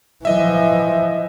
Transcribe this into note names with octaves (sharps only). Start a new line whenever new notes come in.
E3 F3 D#5 E5